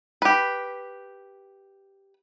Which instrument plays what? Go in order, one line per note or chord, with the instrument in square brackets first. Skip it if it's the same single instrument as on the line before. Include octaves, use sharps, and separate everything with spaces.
[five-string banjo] G4 B4